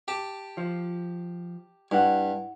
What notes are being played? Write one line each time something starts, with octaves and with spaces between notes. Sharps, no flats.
G4 A5
F3
G2 E4 F#5